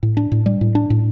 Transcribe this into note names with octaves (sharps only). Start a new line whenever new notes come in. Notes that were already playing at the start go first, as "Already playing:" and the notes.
A2
D4
A2
G3
A2
D4
A2